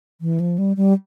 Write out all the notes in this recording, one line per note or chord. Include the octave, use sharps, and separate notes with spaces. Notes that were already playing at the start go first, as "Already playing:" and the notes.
E3
F3
G3
G3